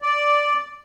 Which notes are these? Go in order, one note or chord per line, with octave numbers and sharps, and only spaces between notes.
D5